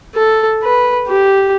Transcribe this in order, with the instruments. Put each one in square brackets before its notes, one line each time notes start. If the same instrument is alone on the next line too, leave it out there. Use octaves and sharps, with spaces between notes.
[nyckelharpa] A4
B4
G4